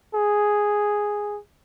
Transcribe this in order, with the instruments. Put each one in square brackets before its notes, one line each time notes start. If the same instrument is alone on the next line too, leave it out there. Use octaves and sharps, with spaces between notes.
[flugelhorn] G#4